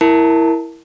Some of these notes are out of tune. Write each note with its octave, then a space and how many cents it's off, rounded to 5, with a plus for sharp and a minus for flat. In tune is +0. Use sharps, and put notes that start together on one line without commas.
E4 +0 A#4 +0 A5 +0